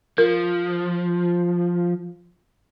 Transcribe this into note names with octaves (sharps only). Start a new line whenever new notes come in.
F3 A#4